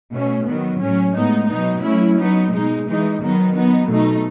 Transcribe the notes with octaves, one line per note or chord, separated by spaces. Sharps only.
B2 A3 C#4
D#3 F#3 B3
A2 F#3 C#4
A2 G#3 B3 D#4
B2 F#3 B3 D#4
F#3 A3 C#4 E4
F#3 B3 D#4
B2 G#3 D#4
E3 G#3 D#4
D#3 F#3 B3 D#4
F#3 B3 D#4
B2 A3 D#4